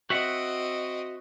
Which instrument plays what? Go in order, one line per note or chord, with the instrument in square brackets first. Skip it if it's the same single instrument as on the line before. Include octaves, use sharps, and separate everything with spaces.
[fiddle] C4 D#5 [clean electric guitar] F#4 E5 F#5